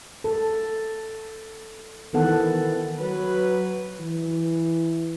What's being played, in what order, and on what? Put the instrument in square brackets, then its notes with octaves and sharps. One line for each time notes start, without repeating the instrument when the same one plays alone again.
[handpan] A4
D#3 E3 B3 A4 F#5
[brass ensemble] F#3 B4
[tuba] E3